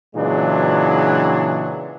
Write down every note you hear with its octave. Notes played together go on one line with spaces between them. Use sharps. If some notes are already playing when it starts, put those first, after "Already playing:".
A#2 C#3 E3 F#3 G#3 D4